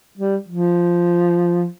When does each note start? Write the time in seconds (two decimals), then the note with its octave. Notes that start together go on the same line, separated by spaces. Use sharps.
0.18 G3
0.48 F3